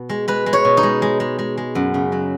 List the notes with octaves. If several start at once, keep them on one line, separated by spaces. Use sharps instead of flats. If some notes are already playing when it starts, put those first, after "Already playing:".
Already playing: B2
G#3
G#3 B4
G#3
C#5
B2
D#4
G#3
G#3
G#3
G#3
G#3
F#2
C#3
F#3